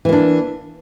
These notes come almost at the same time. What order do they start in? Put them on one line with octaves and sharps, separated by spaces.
E3 A#3 D4